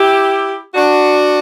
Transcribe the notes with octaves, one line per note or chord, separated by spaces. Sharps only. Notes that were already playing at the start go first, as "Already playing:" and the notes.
Already playing: E4 G4
D4 F#4